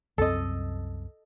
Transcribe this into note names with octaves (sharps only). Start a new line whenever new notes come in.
C2 F#2 C4 A4 D#5